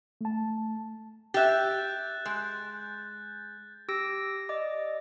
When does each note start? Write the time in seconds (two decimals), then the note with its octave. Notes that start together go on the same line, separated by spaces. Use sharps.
0.21 A3 A5
1.34 G4 E5 F#6 G6 A6
2.25 G#3
3.89 G4 E6 A#6 D7
4.49 D5 D#5 D6